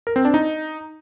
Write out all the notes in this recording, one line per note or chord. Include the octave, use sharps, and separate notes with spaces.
A#4
C4
D4
D#4